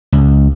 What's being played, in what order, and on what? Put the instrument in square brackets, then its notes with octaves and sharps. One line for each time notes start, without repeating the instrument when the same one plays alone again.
[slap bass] C#2